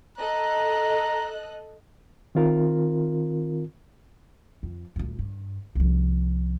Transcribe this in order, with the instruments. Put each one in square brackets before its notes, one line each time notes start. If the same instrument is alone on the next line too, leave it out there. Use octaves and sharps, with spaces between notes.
[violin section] A4 D#5 F#6 [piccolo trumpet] A#5
[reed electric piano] D#3 C4 F4 A#4
[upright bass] F2
D#1 D2
G2
C2 F3